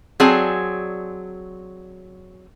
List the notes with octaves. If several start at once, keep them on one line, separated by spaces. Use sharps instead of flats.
F#3 C4 G#4 D5 G#5 A5